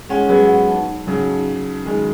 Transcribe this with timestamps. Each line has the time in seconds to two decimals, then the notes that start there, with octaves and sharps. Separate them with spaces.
0.09 G#3 C#4 F#5
0.29 F#3 B3 G#4
0.48 F#5
0.68 D#4
0.87 D#4
1.07 C#3 F#3 D#4
1.26 D#4
1.46 D#4
1.65 D#4
1.85 D#3 G#3 F#4